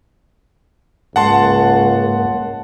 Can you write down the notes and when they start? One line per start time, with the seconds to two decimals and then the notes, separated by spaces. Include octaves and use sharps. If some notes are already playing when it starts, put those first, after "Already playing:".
1.16 C#2 G#2 A#3 F#5 A5 C6